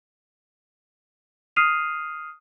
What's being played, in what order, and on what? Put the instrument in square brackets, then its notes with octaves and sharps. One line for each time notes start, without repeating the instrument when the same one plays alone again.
[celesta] D#6 F6 C7 D#7 F7